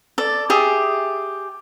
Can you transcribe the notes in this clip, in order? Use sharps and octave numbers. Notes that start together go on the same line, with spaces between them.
A4 D5
G4 G#4 E5